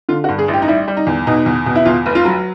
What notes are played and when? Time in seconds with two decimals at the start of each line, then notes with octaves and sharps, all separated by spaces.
0.09 D3 F4
0.24 F#4
0.28 G2
0.39 G#4
0.48 A1
0.53 G4
0.62 D#4
0.68 G3 E4
0.88 G3
0.97 D#4
1.07 E2
1.27 B2 D#4
1.46 E2
1.66 B2
1.75 E4
1.85 E2 F4
2.06 F1
2.15 F4
2.25 F#3